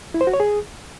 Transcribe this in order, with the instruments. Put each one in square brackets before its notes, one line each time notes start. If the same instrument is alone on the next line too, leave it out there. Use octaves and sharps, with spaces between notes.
[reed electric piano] E4
C5
F#4
C#5
G#4